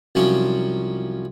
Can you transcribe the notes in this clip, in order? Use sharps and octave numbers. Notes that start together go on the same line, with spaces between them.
C2 F3 F#3 C#4 C#5 D6